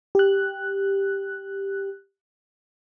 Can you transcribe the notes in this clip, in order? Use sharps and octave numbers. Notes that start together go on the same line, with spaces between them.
G4 F#6